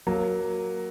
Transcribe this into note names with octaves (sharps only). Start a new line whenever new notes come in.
F#3 A#3